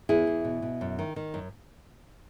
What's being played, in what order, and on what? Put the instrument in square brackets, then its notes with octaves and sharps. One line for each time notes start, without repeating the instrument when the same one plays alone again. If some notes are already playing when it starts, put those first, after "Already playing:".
[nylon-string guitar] E2 E4 G#4
E2
B2
B2
F#2
D#3
D#3
F#2